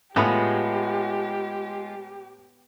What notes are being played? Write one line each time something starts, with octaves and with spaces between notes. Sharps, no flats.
A2 G#3 B3 F4 G4 G#4 C#5